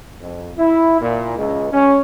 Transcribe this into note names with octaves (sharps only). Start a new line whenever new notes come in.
F2
E4
A#2
C#2
C#4